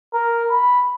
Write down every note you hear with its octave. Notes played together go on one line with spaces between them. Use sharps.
A#4
B5